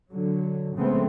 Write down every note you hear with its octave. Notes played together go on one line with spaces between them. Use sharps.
D3 F#3
C#3 F3 G#3 A3 B3 C4